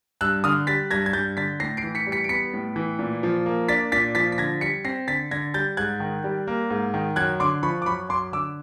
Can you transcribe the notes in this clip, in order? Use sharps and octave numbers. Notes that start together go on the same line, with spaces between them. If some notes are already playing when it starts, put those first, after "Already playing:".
G2 E6 F#6
D3 D#6 F6
G3 A6 B6
G2 G#6 A#6
G#6
G2 G6 A6
D3 A6 B6
A2 A#6 C7
C7 D7
E3
B6 C#7
G3
B6 C#7
D7
B3 B6 C#7
A2
E3
A#2
F3
A#3
D4 A6 B6
A#2 A6 B6
F3 A6 B6
B6
D3 G#6 A#6
G3 B6 C#7
C4 A#6 C7
D3 A6 B6
D3 G#6 A#6
G3 G6 A6
G#2 F#6 G#6
D#3
G3
A#3
G#2
D#3
F#2 F#6 G#6
D3 C6 D6
F3 B5 C#6
D6
F#2 B5 C#6
F#2 C6 D6
D3 D6 E6